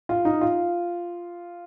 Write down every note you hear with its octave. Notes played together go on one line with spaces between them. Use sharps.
F4
D#4
F4